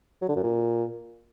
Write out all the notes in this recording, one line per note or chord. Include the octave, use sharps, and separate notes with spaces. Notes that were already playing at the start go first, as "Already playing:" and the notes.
F#3
D3
F#2
A#2